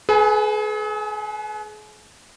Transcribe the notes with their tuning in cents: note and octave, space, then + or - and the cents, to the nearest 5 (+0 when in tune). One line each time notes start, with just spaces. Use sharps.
G#4 +40 B4 +0 G#5 +0